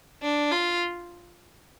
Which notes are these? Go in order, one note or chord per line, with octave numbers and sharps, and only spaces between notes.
D4
F4